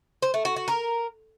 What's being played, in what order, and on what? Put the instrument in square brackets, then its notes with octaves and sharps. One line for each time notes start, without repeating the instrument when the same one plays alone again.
[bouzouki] C5
A3
F#4
F#4
A#4